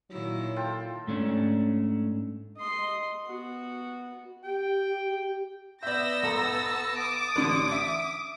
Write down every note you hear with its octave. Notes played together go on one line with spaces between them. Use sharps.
A#2 D#3 F#3 E4
F4 A4 G5
G#2 A3 C#4 D4
D#5 C6
B3 F#4
G4 G5
B3 D5 E5 E6 G6 A#6
B1 A4 A5 A#5
D6 D#6
A1 D3 D4
E5